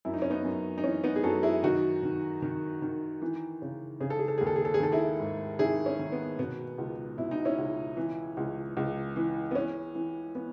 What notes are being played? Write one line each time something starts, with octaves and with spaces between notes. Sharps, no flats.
F#2 E4
D#4
C#4
B3 D#4
F#2
D#4
E3 C#4
B3 D#4
G#4
F#2 F#4 A4
E4 G#4
D#3 D#4 F#4
D#3
D#3
D#3
E3
C#3
C#3 G#4
A4
G#4
A4
D#2 G#4
A4
G#4
A4
G#4
D#3 A4
E4 G#4
G#2
D#3 E4 G#4
C#4
D#3
B3
B2 B3
C#2
B2 E4
D#4
C#4 E4
C#2
E3
C#2
C#2
E3
B3
E3 C#4
E3
E3 B3